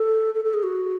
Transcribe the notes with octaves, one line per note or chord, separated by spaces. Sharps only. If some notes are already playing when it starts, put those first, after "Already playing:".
Already playing: A4
A4
A4
G#4
F#4